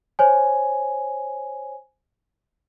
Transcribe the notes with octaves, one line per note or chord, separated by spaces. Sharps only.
C5 C#5 G#5